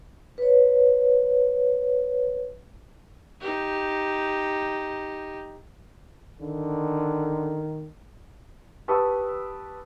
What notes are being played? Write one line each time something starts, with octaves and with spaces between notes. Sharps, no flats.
B4 C#5
D#4 G4
D3 D#3
G4 B4 A5 C#6 D#6 E6